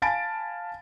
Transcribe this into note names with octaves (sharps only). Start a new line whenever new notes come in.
F5 G#5 A5 B5 A6 D7